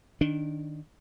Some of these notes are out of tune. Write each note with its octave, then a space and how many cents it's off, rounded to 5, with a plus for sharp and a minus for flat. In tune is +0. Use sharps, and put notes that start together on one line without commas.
D#3 -15 D4 -10